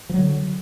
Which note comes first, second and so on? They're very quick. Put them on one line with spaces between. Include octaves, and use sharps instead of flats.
F3 F#3 D3